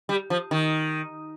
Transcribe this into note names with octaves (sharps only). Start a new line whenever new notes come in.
G3
F3
D#3